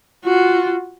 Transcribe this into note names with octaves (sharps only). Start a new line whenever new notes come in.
F4 F#4